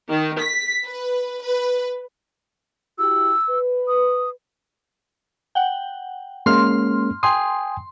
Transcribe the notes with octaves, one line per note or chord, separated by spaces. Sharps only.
D#3
B6
B4
B4
E4 F#4 G4 E6
B4
D#6
F#5 G5
G#3 A#3 C#4 C6 F6
G5 G#5 C6 D#6